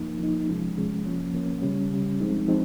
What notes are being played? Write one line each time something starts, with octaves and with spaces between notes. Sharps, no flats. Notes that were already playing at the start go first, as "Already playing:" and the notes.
Already playing: F3 A#3 D#4
F3 A#3 D#4
C3 F3 G#3 C#4
C3 F3 G#3 C#4
F3 A#3 C#4
F3 A#3 C#4
C#3 G3 C#4
C#3 G3 C#4
F3 G#3 C4 D#4
F3 G#3 C4 D#4